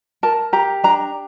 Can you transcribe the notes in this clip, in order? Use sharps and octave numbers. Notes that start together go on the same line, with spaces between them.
A#4 A5
G4 A#5
D4 A#5